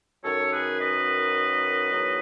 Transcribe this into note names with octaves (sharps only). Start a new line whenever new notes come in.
F#2 D#3 F#3 A4 C#5
G#4 B4
B4 D#5
E2 D#3 F#3